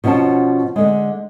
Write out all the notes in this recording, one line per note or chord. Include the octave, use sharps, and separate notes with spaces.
B2 F3 C#4 F#5 A5
D3 G#3